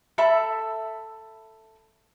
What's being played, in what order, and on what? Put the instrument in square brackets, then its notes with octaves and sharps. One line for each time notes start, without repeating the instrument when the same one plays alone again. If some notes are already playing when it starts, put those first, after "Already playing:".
[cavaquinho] A4 E5 B5